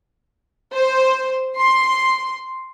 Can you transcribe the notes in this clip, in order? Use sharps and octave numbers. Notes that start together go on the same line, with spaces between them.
C5
C6